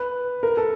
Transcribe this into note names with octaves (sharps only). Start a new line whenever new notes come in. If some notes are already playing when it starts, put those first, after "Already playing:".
Already playing: B4
A#4
A4